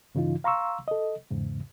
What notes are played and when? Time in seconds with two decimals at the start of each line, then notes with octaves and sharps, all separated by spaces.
0.15 G2 C#3 E3 D#4 F4
0.44 F5 A#5 C6 C#6 E6
0.88 A4 D#5
1.30 E2 G#2 C#3